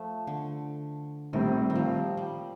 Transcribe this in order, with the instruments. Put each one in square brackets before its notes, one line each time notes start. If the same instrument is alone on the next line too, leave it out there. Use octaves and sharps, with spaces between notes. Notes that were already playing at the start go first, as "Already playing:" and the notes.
Already playing: [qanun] F3 A3
D3
[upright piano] A#1 A2 G3 C4 [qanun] D#3
[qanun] D#3
F3
G3